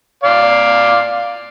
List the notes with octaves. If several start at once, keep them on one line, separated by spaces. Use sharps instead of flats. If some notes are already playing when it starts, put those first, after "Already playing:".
D5 F5